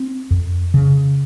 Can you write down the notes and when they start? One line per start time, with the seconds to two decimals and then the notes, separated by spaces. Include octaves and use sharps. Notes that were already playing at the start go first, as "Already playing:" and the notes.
Already playing: C4
0.31 F2
0.74 C#3